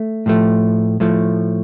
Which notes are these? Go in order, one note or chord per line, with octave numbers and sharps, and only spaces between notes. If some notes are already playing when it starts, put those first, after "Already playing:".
Already playing: A3
A2 F3 A3
A2 F3 A3